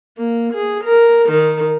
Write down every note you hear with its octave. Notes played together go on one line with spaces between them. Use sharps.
A#3
G#4
A#4
D#3